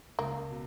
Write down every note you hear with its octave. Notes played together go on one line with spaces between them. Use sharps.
C#2 A#3
B2